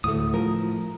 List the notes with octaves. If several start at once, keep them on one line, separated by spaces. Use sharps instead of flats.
D2 A2 A3 D#6
F3 A#4